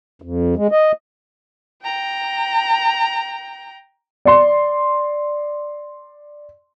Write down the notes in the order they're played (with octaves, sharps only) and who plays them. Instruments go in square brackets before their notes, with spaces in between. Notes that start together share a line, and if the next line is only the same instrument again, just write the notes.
[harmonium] F2
G#3
D#5
[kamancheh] G5 A#5
[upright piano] D5 C6